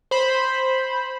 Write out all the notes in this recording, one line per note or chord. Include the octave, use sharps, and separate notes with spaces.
C5 B5